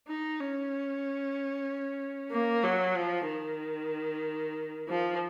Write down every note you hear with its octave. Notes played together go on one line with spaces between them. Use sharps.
D#4
C#4
A#3
F#3
F3
D#3
F3